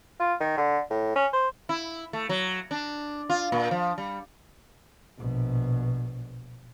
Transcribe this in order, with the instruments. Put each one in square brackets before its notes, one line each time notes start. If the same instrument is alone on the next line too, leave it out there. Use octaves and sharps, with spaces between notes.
[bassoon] F4
D#3
D3
A2
C#4
C5
[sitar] E4
A3
F#3
D4
F4
A#2
F3
G3
[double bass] A#1 B2